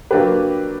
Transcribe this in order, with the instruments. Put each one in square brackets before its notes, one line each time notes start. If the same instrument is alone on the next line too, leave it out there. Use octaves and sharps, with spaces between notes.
[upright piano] F#3 A#3 D4 G4 B4